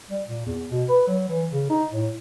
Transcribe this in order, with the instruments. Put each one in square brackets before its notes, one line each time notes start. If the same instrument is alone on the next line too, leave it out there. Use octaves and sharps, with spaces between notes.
[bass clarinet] G3
A#2
E2
B2
B4
F#3
E3
C#3
D#4
A2